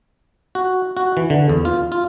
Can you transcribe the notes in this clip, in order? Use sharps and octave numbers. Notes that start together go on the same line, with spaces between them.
F#4
F#4
E3
D3
E2
F4
F4